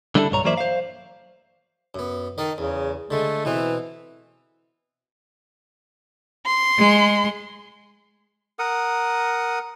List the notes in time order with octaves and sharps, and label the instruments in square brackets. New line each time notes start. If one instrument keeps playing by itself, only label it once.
[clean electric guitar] D3 G3 D4 E4 G#4 A4
B1 G2 C#5 A#5
E3 F#3 A#3 C5 D5 E5
C5 F5
[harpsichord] F#2 B3
[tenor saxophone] D#3 [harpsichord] A4 A#4 D#5
[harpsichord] E2 [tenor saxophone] C#3
[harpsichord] D3 G#3 [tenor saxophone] A3
[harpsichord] B2 B3 C4 [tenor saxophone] E3
[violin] C6
[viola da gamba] G#3
[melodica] A#4 F#5 D#6